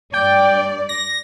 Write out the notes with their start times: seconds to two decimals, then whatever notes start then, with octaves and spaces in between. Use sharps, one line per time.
0.13 G2 D5 G5
0.89 A#6